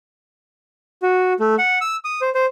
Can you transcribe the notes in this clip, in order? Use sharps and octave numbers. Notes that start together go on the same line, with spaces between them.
F#4
A3
F#5
E6
D#6
C5
C5